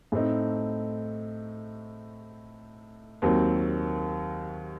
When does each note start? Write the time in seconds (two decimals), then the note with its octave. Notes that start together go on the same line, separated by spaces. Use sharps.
0.12 A2 A3 C4 D#4
3.22 D#2 D#3 F#3 C4